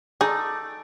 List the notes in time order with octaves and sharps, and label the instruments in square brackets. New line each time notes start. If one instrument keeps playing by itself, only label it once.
[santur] A3 D5 [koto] D#4 [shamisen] G#4